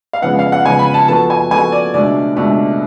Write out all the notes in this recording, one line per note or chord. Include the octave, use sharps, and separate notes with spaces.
F5
C#2 C#3 F3 B3 F#5
F5
F#5
C#2 C#3 F3 B3 G#5
B5
A5
F3 B3 F#4 A4 A5
G#5
F3 B3 F#4 A4 G#5
D5
C#2 B2 A3 D4 D5
C#2 B2 A3 D4